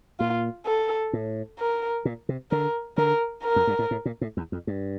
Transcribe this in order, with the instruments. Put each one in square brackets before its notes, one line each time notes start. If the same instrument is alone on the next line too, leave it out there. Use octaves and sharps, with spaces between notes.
[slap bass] A#2 [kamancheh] F4
[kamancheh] A4
[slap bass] A2
[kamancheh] A#4
[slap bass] A#2
C3
[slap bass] D3 [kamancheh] A#4
[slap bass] D3 [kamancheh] A#4
[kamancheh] A#4
[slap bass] F2
G2
A2
A2
A#2
A2
E2
F2
G2